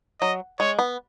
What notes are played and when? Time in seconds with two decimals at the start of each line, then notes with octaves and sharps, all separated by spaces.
0.21 F#3 D#5
0.60 G#3 C#5
0.79 B3